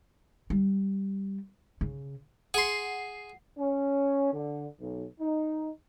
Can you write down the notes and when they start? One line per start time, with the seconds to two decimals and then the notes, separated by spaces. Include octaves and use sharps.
0.50 G3
1.81 C#3
2.54 G#4 F#5 C6 C7
3.58 C#4
4.32 D3
4.80 B1
5.20 D#4